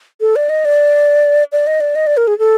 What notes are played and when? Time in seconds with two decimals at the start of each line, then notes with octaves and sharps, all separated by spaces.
0.21 A4
0.36 D5
0.49 D#5
0.65 D5
1.52 D5
1.67 D#5
1.80 D5
1.95 D#5
2.07 D5
2.17 A#4
2.27 G#4
2.39 A4